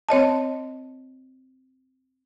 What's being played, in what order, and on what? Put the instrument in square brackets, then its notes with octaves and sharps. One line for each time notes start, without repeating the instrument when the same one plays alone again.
[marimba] C4 C#5 D#5 A5